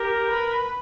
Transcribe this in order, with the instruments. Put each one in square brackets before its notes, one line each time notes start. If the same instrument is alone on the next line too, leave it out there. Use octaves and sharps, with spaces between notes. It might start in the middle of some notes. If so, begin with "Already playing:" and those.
Already playing: [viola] G4 [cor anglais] A#4
[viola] B4